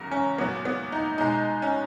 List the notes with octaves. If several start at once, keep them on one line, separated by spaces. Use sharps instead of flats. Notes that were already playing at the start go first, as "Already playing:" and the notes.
Already playing: E2 C#3 F#3 A#4
C#4
A#2 F#3 B3
B3
D#4
B2 G#3 D#4
C#4